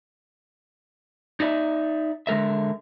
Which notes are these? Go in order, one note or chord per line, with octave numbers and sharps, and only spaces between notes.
D#4 D5 E5
D3 G#3 A#4 E5